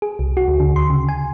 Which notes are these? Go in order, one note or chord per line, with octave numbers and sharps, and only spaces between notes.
G#4
C2
F#4
D2
D3
C6
C#3
G#5